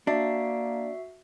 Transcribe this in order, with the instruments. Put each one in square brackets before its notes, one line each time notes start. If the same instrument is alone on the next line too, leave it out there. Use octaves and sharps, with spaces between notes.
[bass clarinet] A#3 [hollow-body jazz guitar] D4 [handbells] F#4 E5 C7